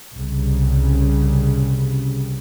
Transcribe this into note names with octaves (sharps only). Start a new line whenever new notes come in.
C2 C#3